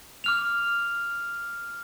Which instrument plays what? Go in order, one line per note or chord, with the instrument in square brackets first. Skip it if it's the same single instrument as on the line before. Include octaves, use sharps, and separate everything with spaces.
[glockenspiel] D6 F6 F7